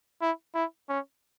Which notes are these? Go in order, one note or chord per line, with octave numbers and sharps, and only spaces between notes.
E4
E4
C#4